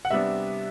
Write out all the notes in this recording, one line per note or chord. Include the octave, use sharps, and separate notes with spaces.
F#5
C3 G3 B3 D4 E5